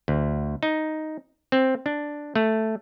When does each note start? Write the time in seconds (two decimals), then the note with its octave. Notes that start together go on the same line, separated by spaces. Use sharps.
0.08 D2
0.63 D#4
1.52 C4
1.86 D4
2.36 A3